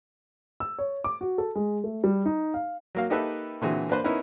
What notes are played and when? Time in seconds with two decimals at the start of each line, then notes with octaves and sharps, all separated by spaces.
0.60 E6
0.79 C#5
1.04 D6
1.21 F#4
1.38 A4
1.55 G#3
1.84 A3
2.04 G3
2.26 D#4
2.54 F5
2.95 F#3 A#3 F5
3.10 A#3 D#4 G4 A4 B4 E5
3.61 A#2 D3 E3 C4 F#4 G#4
3.89 A#3 D4 B4 C5
4.04 B3 C#4 D#4 E4 A#4 B4